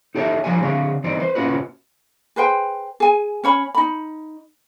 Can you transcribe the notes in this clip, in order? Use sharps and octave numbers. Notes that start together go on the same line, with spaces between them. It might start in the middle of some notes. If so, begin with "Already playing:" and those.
D#4 G4 A4 C#5 D#5 E5
F3 G3 D4 G#5
D3 C4 D4 F5
E3 G3 C4 D#4 D5
B4 C5
A#2 C#4 F4 F#4 B4
G#4 B4 C5 G5
G#4 G#5
C#4 C#5 B5
D#4 B5